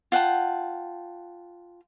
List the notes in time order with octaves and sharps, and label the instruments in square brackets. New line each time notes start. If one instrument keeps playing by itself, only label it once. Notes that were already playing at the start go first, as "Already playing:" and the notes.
[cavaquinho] F4 F#5 G5 A5